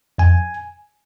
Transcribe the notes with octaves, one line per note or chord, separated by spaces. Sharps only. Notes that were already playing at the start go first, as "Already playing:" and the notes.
F2 G#5